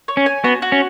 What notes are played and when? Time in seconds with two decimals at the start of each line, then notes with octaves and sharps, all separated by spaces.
0.08 C#5
0.17 C#4
0.26 G#5
0.44 B3 F#4
0.62 F#4
0.72 C#4